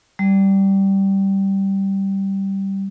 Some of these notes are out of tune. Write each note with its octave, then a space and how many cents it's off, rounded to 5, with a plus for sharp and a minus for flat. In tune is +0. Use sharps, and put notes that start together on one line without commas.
G3 -10